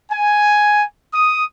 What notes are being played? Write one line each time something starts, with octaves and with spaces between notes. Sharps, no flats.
G#5
D#6